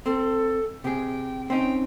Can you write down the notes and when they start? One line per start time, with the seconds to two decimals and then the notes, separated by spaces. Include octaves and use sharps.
0.06 C4 A4
0.84 C3 G#4 G5
1.50 C4 C#4 D#4 G5